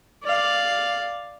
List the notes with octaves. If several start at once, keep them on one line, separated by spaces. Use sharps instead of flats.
D5 F5